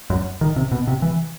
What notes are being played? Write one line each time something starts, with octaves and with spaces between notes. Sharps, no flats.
F#2
D#3
C3
B2
C3
E3